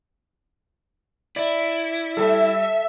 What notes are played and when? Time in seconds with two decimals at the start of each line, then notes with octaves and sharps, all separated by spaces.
1.36 E4 D5
2.17 G3 A4 E5